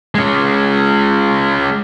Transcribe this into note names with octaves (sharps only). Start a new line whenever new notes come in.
G#3 C#4